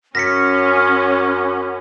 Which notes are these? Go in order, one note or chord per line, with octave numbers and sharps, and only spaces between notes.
F#2 C#4 F6 A#6 B6 C#7